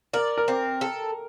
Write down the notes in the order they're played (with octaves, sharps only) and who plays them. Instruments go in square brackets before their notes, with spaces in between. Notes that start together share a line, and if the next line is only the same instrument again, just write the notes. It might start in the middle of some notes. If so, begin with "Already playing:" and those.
[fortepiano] A#4 [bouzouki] D5
[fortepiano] A#4
[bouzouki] C4
A4